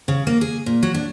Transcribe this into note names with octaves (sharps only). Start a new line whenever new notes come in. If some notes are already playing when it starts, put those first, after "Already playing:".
C#3
A#3
G#4
A#2
F#3
D4